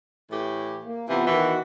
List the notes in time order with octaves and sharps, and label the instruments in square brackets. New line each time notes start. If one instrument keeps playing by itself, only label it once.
[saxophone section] A2 E3 G4
[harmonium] A#3
[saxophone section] C3 E3 [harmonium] B3 F4
[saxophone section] B2 E3 [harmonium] D#3 F#4 F#5